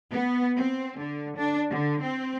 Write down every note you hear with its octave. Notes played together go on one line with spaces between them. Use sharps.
B3
C4
D3
D4
D3
C4